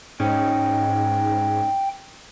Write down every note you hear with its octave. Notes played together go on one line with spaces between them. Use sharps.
G#2 C#4 D#4 G5